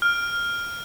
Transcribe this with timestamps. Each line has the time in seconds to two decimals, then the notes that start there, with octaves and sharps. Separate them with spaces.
0.02 F6